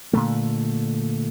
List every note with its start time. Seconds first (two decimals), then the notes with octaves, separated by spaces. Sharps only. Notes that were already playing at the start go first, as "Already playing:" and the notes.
0.13 A#2 D3 A3